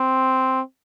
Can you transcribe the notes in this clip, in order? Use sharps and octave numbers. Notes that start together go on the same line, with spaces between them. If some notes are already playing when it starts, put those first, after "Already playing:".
Already playing: C4